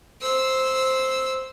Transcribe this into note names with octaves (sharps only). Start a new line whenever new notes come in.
C5 E6